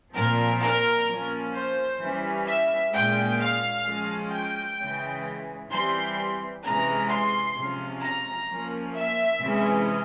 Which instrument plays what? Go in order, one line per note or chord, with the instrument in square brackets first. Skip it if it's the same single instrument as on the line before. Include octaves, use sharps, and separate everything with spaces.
[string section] A#2 F3 C4 A#4
A#4
F3 A#3 C#4
C5
E3 G3 C#4
E5
A#2 G#3 C#4 G5
F5
F3 G#3 C#4
G5
C#3 E3 G#3 C#4
E3 G3 C4 C6
C3 E3 G#3 C#4 A#5
C6
C3 F3 G#3 C#4
A#5
F3 A#3 C#4
E5
C3 E3 G#3 C#4